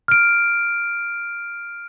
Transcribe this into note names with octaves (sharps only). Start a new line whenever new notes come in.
F6 D7